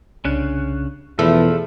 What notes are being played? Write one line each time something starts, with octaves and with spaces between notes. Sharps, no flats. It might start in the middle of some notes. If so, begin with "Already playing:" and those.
C2 C#3 C#4 D4 F#6
E2 B2 E3 F3 A3 A4 B5